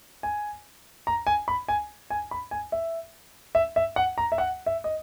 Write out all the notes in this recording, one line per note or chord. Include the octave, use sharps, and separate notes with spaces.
G#5
A#5
G#5
B5
G#5
G#5
B5
G#5
E5
E5
E5
F#5
A#5
E5
F#5
E5
D#5